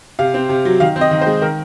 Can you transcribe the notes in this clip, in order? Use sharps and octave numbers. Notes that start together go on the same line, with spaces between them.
C3 F5
C4
C3
F#3
D#3 F5
C4
D#5
D#3
C5
G#3
D#3 A#4